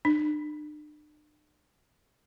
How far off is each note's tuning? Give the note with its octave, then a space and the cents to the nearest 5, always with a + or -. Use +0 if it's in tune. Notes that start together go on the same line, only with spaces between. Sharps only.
D4 +45